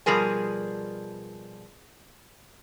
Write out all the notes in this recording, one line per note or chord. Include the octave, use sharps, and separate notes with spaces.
B2 F3 G3 G#4 A#4 G#5